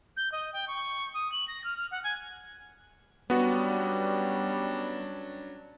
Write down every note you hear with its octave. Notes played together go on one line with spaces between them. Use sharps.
G6
D#5
G5
C#6
D#6
F#7
A#6
F6
F6
F#5
G#5
F#3 G3 B3 C#4 D4 F#4